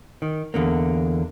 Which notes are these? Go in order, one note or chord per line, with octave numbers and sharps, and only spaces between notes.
D#3
E2 D3 A#3